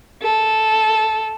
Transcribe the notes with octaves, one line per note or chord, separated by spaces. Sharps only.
A4